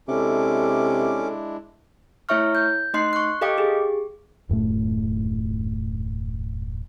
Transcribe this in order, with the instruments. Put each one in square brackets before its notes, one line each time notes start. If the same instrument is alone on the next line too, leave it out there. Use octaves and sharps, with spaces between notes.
[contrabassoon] C3 [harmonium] G#3 D4 E4 [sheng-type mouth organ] C#4 D6 [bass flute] A4
[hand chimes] A3 E4 C#5 E5 C#6 F6
G6
A3 D#4 D#5 C6 F#6 C7
C#6 F#6
G4 A4 D#5 F5 G5 D6
G4 G#4
[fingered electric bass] D#1 F#2 A2 A3